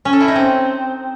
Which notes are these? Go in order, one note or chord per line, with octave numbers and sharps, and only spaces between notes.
C#4
A4
E4
D#4
C4